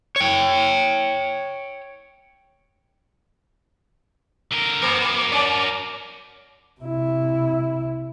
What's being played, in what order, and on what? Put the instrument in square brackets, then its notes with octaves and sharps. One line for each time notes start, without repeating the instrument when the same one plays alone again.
[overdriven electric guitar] C#5 G5
[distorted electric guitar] D3 A#4
[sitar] A#3 [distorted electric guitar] F#4 A#4
[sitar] C#4 D5
[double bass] C3 E4